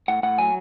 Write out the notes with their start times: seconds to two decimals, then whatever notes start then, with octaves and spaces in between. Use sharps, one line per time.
0.08 A2 F#5
0.23 A2 F#5
0.38 F#3 G#5